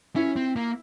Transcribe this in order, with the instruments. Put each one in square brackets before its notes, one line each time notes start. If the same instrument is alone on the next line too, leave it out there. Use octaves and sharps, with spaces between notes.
[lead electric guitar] C#4 [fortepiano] E4
[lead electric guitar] C4
A#3